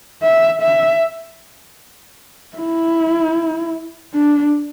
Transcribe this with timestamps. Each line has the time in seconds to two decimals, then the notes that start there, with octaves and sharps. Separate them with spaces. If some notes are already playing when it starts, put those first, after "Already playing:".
0.23 E5
0.62 E5
2.57 E4
4.14 D4